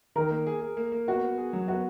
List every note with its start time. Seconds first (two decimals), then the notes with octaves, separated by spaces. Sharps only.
0.16 D#3 A#4
0.30 A#3
0.47 G#4
0.62 G#4
0.77 A#3
0.92 A#3
1.08 B3 F#4
1.23 B3
1.38 G#4
1.53 F#3
1.68 B3 F#4